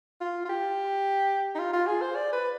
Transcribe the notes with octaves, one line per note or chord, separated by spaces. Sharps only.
F4
F4
G4
D#4
F4
F4
G#4
C5
D5
B4